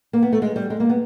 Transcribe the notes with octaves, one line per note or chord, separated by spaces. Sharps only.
A#3
B3
A3
G#3
G3
G#3
A#3
B3